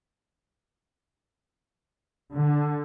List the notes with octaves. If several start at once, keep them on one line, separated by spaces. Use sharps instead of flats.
D3